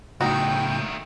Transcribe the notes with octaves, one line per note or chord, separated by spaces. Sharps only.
C#2 A2 D#3 A3 D#4 F#4 G5